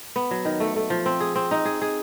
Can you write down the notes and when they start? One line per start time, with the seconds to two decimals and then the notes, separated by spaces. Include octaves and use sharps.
0.16 B3
0.31 F#3
0.45 D#3
0.60 A3
0.76 A3
0.90 F3
1.06 C4
1.21 G#4
1.36 C4
1.51 D#4
1.65 G#4
1.82 G#4